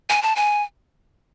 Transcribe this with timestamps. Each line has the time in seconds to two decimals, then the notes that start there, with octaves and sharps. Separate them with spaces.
0.10 G#5
0.22 A5
0.36 G#5